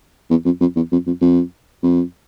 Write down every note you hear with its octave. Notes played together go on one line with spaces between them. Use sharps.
E2
F2
F2
E2
F2
F2
F2
F2